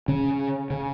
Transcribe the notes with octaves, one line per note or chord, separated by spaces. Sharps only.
C#3 C#4
C#3